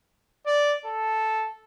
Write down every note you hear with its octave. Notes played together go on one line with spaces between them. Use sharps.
D5
A4